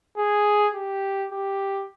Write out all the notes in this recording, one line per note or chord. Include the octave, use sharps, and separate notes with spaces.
G#4
G4
G4